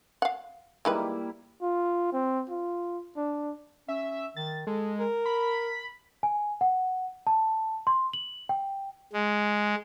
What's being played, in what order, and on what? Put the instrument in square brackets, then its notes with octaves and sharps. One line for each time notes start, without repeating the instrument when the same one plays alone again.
[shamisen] F5 F#5
[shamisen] D#3 G#3 B4 [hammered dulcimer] G3 A#3 E4
[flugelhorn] F4
C4
F4
D4
[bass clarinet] C#4 [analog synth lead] E5
[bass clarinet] D#3 [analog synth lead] A6
[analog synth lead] G#3 [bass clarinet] A4
[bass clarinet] A#4
[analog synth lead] B5
[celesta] G#5
F#5
A5
C6
F#7
G5
[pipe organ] G#3